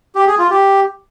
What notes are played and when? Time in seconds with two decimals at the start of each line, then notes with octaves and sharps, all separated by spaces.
0.15 G4
0.27 G#4
0.39 F4
0.50 G4